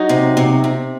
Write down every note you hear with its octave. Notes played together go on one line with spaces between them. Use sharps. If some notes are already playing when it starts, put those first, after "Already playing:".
Already playing: F#3 D#4
C3
C3
C3